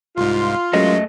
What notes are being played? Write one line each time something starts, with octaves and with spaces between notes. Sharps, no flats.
C2 G#2 F4
F#2 F#3 G#3 A3 D#5